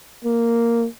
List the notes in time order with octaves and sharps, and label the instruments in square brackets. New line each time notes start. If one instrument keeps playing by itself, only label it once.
[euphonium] A#3